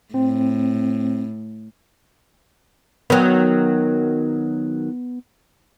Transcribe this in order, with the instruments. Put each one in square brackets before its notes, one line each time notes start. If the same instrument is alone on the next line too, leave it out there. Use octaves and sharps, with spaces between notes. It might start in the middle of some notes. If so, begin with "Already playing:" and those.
[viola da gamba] A2 [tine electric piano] C4
[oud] D#3 F#3 [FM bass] B3